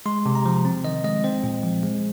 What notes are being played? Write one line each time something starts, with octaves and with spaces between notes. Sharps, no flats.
G#3 C6
C3
A#5
F3
C4
D#3 D#5
G#3 D#5
C4 C5
A#2
F3
G#3